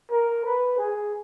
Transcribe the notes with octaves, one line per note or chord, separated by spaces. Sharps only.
A#4
B4
G#4